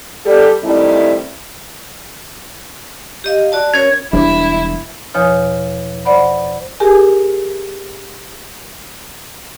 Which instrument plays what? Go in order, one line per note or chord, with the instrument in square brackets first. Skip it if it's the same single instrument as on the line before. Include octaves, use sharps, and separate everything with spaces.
[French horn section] G3 G4 A4
D#3 G3 A3 C4 E4
[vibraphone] G4 D#5 F5
F#4 D5 A5
[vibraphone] C#4 A#4 C#5 [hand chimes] G#6
[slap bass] E1 G3 D4 [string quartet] E4
[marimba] E2 B2 F3 C#5 D#6 F6
C5 D5 F#5 B5
G4 G#4 A#4 G#5